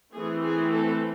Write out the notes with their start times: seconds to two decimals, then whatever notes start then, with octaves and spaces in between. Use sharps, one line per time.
0.13 E3 A3 C4 G#4
0.42 G#4
0.71 A4